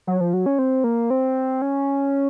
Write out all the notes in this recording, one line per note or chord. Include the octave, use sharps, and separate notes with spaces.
F#3
F3
F#3
C#4
C4
A#3
C4
C#4